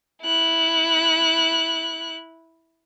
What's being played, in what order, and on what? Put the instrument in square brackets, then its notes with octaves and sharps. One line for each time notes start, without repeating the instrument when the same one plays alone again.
[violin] E4 F#6